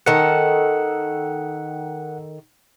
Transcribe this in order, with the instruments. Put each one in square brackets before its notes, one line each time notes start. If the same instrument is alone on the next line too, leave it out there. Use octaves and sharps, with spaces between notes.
[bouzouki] D#3 A4 [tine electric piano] A#4 F#5